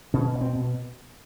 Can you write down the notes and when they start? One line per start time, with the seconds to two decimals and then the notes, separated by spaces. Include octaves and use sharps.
0.14 B2 C#4
0.35 B2
0.41 C4
0.55 B2